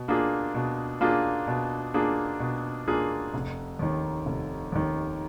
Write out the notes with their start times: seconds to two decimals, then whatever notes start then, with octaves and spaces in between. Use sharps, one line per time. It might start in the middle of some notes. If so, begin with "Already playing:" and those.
Already playing: B2
0.08 A#3 D4 F4 G#4
0.55 B2
1.01 A#3 D4 F4 G#4
1.47 B2
1.94 A#3 D4 F4 G#4
2.40 B2
2.87 A#3 D4 F4 G#4
3.34 F1
3.79 D#2 D#3
4.26 F1
4.72 D#2 D#3